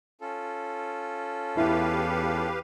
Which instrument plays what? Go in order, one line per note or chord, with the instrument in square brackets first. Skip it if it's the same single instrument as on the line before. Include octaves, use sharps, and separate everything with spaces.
[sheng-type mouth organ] C#4 F4 A4
[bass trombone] E2 [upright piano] E4 [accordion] G4 B4 F5